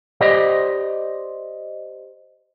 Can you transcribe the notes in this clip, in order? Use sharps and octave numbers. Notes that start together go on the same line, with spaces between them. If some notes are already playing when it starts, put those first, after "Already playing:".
G4 C5 D5 D#5